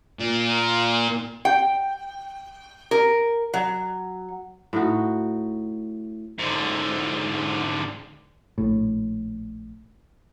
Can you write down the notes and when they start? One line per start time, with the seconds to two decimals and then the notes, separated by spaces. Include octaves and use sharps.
0.19 A#2
1.45 G5
2.91 A#4
3.54 F#3
4.73 A2 D#4 F#4
6.39 G#2 D3
8.58 A#1 A2